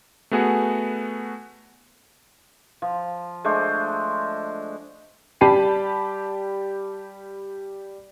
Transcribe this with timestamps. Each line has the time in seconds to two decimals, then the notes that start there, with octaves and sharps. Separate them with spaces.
0.31 A3 B3 F#4 G#4
2.82 F3
3.44 G#3 A3 D4 C5
5.41 G3 G4 A5 B5 C7 D#7